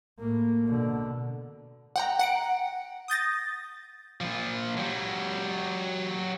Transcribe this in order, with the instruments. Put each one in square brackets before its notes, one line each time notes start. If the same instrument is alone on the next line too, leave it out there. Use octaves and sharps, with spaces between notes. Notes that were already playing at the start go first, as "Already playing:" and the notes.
[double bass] A2 A#3
B2 D3
[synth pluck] F#5 G5 A#5
F#5 C#7 D7
D#6 G6 A6 A#6
[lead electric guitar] A#2 F3
F#3 G4